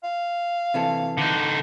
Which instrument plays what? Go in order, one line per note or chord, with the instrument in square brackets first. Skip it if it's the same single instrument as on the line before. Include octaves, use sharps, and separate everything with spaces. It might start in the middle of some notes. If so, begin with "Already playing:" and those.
[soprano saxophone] F5
[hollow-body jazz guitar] C3 E3 A4
[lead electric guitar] D3 D#4